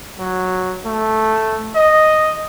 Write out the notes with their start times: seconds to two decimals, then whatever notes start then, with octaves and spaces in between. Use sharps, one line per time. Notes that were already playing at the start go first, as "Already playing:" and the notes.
0.19 F#3
0.86 A3
1.75 D#5